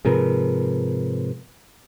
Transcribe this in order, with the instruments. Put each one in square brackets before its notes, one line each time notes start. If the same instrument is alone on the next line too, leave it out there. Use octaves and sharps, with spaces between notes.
[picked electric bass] G#2 C3 F3 [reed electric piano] G#4 A#4 B4